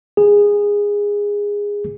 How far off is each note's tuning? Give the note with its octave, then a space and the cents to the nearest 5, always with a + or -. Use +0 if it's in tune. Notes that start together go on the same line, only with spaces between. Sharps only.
G#4 -15